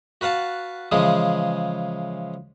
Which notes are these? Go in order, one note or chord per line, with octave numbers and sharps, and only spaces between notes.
F#4 B4 F5 F#5 A5
C#3 E3 F3 G#3 G#4